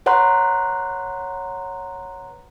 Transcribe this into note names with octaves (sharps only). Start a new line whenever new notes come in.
B4 C#5 F#5 A#5 C6 F#6